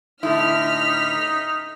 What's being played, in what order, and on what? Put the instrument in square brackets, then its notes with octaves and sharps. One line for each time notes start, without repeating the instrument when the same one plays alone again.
[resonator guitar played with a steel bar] A2 D3 E4 [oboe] D#4 [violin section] F6 B6